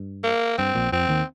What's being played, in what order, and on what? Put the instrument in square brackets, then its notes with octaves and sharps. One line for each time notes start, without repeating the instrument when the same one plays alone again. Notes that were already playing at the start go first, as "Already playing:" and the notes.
Already playing: [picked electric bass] G2
[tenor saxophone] A#3
[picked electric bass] G2 [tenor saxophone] C4
[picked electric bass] A#1 A#2
[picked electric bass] F2 F3 [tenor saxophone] C4
[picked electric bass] D#2 D#3